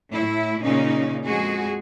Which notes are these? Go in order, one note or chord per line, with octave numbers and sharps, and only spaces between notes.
A2 E4
A#2 C#3 C#4 D#4
F2 G#3 F#4 G#4